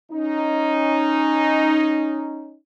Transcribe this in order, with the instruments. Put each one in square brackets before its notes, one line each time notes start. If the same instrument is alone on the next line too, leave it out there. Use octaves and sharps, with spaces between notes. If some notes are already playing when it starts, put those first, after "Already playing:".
[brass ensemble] C#4 D#4